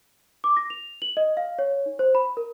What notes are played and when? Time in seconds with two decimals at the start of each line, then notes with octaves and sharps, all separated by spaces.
0.44 D6
0.57 A#6
0.70 F7
1.02 F#7
1.17 D#5
1.37 F5
1.59 C#5
1.86 D#4
1.99 C5
2.15 B5
2.37 A#4